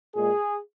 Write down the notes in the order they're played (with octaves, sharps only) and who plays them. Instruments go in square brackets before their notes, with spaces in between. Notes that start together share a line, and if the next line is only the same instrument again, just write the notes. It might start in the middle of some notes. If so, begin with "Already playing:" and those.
[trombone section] A#2 G#3 G#4